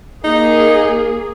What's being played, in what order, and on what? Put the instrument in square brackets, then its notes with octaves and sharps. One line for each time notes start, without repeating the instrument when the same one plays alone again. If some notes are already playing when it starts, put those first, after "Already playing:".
[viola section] A#3 G#4 [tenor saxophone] D#4